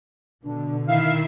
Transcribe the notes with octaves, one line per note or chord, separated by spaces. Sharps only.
B2 D3 D4
D#3 E4 E5 F5 C7